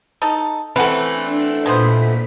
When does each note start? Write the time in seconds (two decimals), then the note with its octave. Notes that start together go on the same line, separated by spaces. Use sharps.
0.22 D#4 A4
0.76 E3 A3 C4 C#4 B4 F#5
1.14 D4
1.66 A#2 G#3 B3 C5 B6